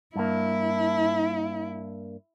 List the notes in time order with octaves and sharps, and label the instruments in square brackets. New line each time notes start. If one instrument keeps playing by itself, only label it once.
[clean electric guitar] G2 A#3 [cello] E4